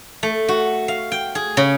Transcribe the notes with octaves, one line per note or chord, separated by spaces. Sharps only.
A3
F#4
F5
G5
G#4
C#3